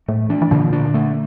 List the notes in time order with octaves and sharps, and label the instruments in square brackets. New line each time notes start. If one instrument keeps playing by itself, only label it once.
[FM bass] A2 [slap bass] A3
[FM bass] E3 [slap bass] D4
[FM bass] E3
[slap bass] A#2 [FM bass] D3
[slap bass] D4
A3